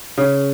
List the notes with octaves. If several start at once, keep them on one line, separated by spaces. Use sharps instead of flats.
C#3